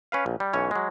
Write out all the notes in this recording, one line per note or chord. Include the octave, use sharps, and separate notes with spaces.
C#4 B4 F5
A#1
G3
B1 E3 C#4 C#5
F#3 G#3